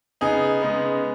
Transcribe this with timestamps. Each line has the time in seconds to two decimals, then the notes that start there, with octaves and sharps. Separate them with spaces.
0.21 C#3 B3 D#4 G#4
0.62 C#3 G#3 B3